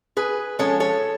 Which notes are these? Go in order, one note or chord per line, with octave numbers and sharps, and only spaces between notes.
G#4 B4
F3 G#3 C#4 A4 C#5
A4 C#5